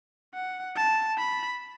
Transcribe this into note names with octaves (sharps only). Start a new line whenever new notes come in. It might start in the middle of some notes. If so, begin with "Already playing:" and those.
F#5
A5
B5